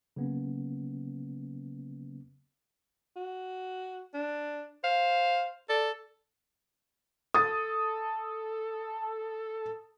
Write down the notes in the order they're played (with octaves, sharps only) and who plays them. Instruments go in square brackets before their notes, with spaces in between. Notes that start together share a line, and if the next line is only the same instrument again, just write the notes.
[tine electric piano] C#3 F#3 A#3 B3 C#4
[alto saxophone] F#4
D4
[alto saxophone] C5 [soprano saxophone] F5
[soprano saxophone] A4 [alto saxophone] D5
[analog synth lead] A4 [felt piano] D#6 A6